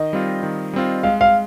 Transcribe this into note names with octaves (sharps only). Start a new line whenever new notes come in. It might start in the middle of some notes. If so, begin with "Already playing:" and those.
Already playing: D#3 D#5
G3 C4 F4
D#3
G3 C4 F4
G#3 F5
F5